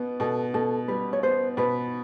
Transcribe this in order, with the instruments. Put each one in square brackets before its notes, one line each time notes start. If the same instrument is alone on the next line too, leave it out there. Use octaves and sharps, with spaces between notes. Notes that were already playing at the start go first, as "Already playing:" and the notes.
Already playing: [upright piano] B2 B3
[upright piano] B2 [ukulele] A4
[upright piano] B2 [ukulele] A4
[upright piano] G3 [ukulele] B4
[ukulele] C#5
[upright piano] B3 [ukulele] C5
[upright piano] B2 [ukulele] B4